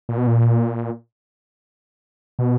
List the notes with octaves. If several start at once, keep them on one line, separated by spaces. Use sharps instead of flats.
A#2
B2
A#2
B2